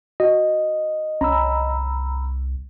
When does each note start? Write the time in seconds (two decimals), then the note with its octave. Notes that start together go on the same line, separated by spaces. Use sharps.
0.20 F#4 D#5
1.21 C2 C#4 A#5 B5 E6